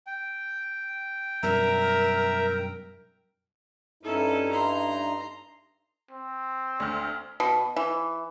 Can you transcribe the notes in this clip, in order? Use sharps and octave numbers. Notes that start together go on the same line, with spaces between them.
G5
F#2 B2 G3 A#4 E5 A#5
G2 C#4 D#4 E4 A4
A#5 C6
C4
D2 F6
B2
E3